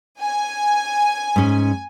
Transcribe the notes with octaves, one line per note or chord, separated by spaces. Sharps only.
G#5
G#2 C#4